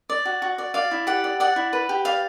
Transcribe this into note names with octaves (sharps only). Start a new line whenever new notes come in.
D5
F#4
F#4
D5
D5 F5
E4
G4 F#5
D5
D5 F#5
E4
B4
G4
D5 F5